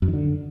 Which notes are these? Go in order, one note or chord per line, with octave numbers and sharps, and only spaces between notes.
F#2
D#3
D3